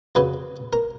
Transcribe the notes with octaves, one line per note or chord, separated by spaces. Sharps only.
F2 C#3 F#3 B4
A#4